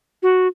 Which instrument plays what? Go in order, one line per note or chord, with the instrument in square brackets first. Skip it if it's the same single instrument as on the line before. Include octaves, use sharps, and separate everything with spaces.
[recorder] F#4